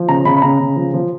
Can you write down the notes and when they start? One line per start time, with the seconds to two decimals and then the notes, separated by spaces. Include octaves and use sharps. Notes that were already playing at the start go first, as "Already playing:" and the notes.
Already playing: F3
0.08 C#3 A#5
0.25 C#3 B5
0.37 B5
0.42 C#3 A#5
0.60 C#3
0.76 F3
0.94 F3